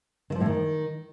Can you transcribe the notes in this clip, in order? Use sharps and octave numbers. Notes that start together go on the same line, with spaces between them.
D#3
F3
A2
D#3